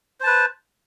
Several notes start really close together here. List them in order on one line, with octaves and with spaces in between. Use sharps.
C5 A5 B4